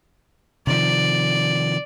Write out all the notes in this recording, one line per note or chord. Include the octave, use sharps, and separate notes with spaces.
C3 D#3 F3 D5